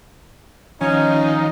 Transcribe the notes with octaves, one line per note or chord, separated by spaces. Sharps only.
D#3 F3 C#4 D#4